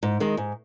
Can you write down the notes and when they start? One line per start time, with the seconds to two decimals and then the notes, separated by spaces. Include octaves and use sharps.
0.03 G#2
0.20 D#3 G#3
0.37 G#2